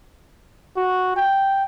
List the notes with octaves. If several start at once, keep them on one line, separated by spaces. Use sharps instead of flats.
F#4
G5